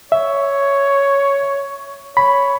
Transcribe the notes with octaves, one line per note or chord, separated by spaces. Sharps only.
C#5 E5
C#5 B5